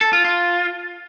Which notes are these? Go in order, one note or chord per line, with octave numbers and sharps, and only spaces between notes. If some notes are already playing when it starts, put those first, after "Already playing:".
A4
F4
F4